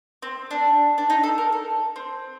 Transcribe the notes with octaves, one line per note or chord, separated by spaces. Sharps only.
C4
D4
D4
D#4
A4
A#4
A4
C4